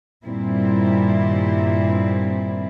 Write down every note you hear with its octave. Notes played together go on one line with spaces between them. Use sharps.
G2 A#2 D#3 G3 C4 E4